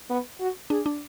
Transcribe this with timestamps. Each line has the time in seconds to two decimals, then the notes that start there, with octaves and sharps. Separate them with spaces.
0.09 B3
0.40 F#4
0.70 D4 G#4
0.86 D4